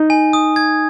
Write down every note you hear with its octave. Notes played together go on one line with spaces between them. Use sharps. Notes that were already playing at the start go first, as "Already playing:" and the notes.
Already playing: D#4
G#5
D#6
G#6